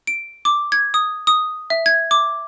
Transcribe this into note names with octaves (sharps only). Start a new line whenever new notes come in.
D7
D6
G#6
D#6
D#6
E5
G#6
D6